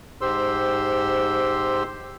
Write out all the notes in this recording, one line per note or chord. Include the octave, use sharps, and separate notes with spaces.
G#2 G4 C5 C6 E6